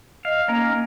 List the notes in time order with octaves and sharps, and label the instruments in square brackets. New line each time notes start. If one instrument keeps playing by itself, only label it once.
[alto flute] D#5 [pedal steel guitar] F5
[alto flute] A#3 [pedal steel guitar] C#4 D#4 A#4